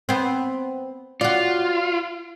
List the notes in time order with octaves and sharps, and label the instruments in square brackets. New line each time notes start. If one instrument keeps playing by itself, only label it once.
[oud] B3 C4
[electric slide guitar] F4 [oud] F#4 D5